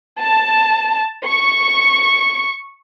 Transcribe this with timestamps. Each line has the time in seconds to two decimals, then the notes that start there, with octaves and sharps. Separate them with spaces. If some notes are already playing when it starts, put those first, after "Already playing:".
0.21 A5
1.27 C#6